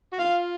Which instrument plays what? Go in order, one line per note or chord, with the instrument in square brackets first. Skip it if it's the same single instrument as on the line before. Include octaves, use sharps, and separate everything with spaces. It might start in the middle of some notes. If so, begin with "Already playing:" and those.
[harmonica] F#4
[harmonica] F4 [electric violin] F5